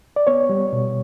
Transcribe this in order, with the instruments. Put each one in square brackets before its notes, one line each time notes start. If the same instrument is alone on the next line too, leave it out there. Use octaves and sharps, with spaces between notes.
[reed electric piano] D5
B3 C#5
G3
B2